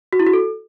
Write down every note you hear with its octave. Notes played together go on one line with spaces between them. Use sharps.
F#4
E4
F#4
A4